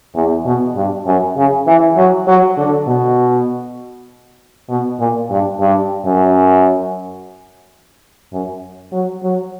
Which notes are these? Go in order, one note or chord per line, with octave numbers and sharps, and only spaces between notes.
E2
B2
G2
F#2
C#3
E3
F#3
F#3
D3
B2
B2
A#2
G2
G2
F#2
F#2
F#3
F#3